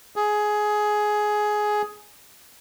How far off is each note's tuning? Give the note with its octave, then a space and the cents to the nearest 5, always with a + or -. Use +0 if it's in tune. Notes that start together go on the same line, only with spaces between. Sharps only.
G#4 +15